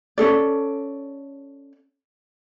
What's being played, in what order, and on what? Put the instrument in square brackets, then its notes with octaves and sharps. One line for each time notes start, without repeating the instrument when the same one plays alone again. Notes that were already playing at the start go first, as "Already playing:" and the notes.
[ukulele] C#4 D4 A4 D5